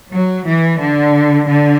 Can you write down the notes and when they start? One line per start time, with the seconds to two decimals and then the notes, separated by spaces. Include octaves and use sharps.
0.11 F#3
0.45 E3
0.79 D3
1.48 D3